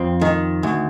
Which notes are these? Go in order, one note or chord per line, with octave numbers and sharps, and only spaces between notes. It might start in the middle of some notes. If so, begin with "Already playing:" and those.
Already playing: F2 C4
D#3
D2